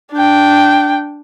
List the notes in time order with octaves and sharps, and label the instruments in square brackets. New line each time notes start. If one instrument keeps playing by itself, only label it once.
[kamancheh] D4 G5